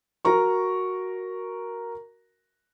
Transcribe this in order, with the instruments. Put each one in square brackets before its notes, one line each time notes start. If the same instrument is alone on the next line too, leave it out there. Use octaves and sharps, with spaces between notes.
[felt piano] F#4 A#4 A#5 C#6